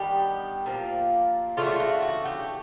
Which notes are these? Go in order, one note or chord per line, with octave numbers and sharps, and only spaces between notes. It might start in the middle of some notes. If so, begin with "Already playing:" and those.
Already playing: D#3 G3 B3 D4 G4
A#2 F3 A#3
C#3 E3 A3 D4 F4
F#4
F4
F#4
F#4
G4